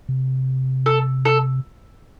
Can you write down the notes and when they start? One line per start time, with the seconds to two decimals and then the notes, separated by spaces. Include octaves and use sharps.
0.09 C3
0.86 A4
1.25 A4